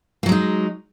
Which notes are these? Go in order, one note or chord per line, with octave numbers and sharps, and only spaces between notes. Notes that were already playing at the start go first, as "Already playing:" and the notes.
F#3 G#3 A#3 D#4